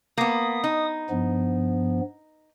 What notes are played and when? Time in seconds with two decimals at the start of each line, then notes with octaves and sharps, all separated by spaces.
0.18 A#3 B3 D#6
0.64 D#4
1.10 G2 F3 B3